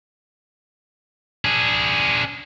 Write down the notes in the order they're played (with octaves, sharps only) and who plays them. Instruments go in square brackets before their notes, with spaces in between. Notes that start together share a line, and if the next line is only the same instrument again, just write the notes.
[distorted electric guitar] D4 G#4